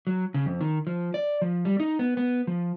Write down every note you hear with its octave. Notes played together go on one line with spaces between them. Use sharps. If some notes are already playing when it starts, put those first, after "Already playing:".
F#3
C#3
F2
D#3
F3
D5
F3
G3
D#4
B3
B3
F3